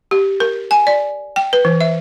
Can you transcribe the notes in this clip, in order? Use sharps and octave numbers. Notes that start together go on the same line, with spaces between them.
G4
A#4
G#5
D5
G5
B4
E3
E5